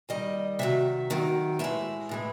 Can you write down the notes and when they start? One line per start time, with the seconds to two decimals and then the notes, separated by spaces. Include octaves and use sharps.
0.09 D#2 D#3 G3 D#5
0.59 C3 D#3 F#3 E5
1.10 C3 D#3 F#3
1.59 A2 E3 G#3 E5
2.09 A2 E3 G#3